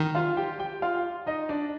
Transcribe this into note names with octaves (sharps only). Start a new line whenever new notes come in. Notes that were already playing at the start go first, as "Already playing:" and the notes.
Already playing: D#3
F4 F5
G4 G5
G4 G5
F4 F5
D#4 D#5
D4 D5